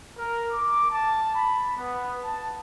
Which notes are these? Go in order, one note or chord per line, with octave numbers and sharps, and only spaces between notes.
A#4
D6
A5
B5
B3
A5